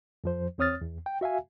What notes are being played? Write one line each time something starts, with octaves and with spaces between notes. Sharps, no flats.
F2 F3 C5
E2 C4 C#5 D#6 F6 A6
E2
G5
F#4 E5 F5 G#5